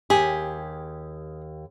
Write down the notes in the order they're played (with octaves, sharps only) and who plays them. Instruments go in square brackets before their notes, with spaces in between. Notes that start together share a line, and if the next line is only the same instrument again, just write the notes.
[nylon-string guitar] D#2 G4 [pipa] G#4